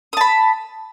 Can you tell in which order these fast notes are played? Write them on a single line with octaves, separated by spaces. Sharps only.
D#6 A5 B5